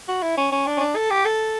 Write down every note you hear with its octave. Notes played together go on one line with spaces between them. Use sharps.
F#4
E4
C#4
C#4
D4
C#4
D4
A4
G4
A4